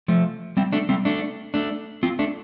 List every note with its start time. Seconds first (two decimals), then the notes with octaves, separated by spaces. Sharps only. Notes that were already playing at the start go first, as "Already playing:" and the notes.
0.08 F3 A3
0.57 G3 C4
0.73 A3 D4
0.89 G3 C4
1.05 A3 D4
1.54 A3 D4
2.03 C4 F4
2.19 A3 D4